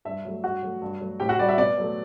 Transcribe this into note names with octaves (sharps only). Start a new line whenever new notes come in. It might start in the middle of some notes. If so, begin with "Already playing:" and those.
G2 E5
F#3 A3
G2 F#4 F#5
F#3 A3
G2
F#3 A3
A2 G4 G5
F#4 F#5
G3 D5
E5
B2 D5
F#3 A3